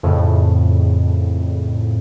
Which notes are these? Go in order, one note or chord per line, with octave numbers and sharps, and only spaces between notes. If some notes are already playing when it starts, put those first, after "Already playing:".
F2 A2 C#3